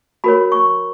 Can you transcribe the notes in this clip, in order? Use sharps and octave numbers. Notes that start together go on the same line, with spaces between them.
F#4 A#4 C#5 B5
C#6